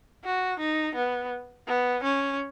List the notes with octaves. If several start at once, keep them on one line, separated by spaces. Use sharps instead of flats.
F#4
D#4
B3
B3
C#4